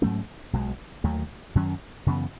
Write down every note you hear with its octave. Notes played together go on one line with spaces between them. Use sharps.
G#2 F#3 A3 C#4
B1 B2 G#3
D#2 D#3 F#3 A3
F#2 D#3 F#3 C#4
F#2 C#3 E3 B3